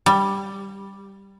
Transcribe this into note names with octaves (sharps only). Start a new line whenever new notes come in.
G3